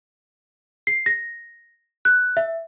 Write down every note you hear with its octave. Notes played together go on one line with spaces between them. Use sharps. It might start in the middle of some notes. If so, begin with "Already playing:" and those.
C7
A#6
F#6
E5